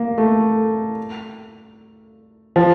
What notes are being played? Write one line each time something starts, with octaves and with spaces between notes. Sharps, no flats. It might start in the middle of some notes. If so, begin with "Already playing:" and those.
Already playing: A#3
A3
F3